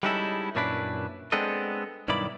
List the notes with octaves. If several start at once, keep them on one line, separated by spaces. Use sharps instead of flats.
G3 G#3 C#4 D#4 E4 A4
F#2 A#2 C#4 D4 E4 B4
G#3 B3 C4 D4 A4 D#5
B1 G2 D#3 E4 D5 B5